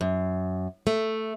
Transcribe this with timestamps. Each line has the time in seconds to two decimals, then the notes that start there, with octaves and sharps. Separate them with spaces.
0.01 F#2
0.87 A3